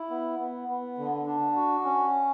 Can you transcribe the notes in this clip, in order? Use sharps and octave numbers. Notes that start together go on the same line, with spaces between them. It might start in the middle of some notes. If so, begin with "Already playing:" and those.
Already playing: E4
B3
B3
B3
D3
D4
F#4
C#4